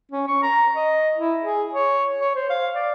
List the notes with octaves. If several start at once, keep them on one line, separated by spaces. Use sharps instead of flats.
C#4
C#6
A#5
D#5
E4
G#4
C#5
C#5
C5
F5
D5